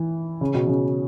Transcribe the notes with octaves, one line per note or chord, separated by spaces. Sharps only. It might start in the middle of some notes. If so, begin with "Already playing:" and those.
Already playing: E3
C#3
B2
C#3